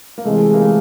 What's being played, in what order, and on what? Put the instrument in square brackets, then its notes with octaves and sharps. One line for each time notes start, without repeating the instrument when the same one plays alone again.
[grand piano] A#3
[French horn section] C3 E3 G#3 [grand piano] A3
[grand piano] A#3
A3